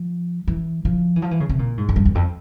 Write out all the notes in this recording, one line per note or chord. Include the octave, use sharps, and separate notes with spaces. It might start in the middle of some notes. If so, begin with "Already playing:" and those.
Already playing: F3
E3
F3
E3
F3
E3
C#3
C3
A#2
G#2
F2
G2
E2
F2